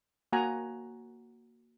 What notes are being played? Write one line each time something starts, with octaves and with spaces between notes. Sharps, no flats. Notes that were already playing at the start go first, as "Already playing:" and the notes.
A#3 F#4 F#5 G#5 A#5